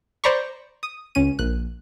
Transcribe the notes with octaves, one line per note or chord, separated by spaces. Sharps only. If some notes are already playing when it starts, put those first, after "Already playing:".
C5 D5 A#5 B5 C#6
D#6
C#2 C#4 D#7
A#1 F#6